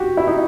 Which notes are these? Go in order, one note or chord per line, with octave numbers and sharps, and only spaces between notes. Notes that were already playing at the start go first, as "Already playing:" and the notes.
Already playing: F#4 G4
E4
D#4